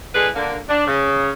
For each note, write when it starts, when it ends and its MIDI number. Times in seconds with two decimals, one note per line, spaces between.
0.14 0.29 52
0.14 0.29 56
0.14 0.29 62
0.14 0.29 68
0.14 0.29 69
0.14 0.29 71
0.34 0.57 50
0.34 0.57 58
0.69 0.87 62
0.87 1.31 49